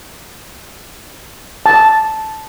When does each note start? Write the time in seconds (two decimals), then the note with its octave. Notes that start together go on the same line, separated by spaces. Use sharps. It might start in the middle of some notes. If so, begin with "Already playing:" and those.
1.66 A5